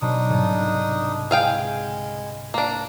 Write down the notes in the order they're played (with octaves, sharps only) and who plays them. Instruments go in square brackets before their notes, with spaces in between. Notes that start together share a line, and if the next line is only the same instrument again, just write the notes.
[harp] B2 F#3 [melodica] D4 D#4 D#6
[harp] C2 G#2 D3
[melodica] G#3 [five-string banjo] G#4 F5 G5
[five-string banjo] A#3 D4 [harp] F4